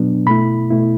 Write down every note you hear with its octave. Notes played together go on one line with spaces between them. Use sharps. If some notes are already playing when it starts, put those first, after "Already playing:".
Already playing: B2 F#3 B3 D4
B2 A3 E4 B5
B2 A3 E4